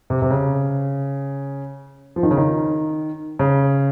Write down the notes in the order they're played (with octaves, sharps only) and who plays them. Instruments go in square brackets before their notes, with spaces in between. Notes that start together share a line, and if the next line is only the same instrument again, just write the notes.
[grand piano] C3
C3
C#3
F3
D#3
C#3
D#3
C#3